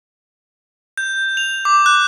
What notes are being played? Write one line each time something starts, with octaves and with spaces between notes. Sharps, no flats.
G6
F7
D6
F#6